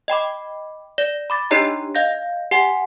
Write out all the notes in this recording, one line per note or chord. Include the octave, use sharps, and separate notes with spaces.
D#5 G5 B5 D6
D5 A#6
B5 D6 A6
D4 D#4 G4 C#5 D#5 A#5
D#5 F5 G6 A#6
G4 F#5 G#5